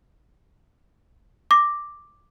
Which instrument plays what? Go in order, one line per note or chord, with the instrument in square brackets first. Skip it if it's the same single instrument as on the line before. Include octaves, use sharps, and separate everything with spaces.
[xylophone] D6 A#6